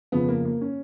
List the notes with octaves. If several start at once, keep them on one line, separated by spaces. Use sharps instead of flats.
F2 C#3 F3 B3
A#3
A#3
C#4